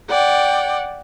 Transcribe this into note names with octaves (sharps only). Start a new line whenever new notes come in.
D5 F#5 G5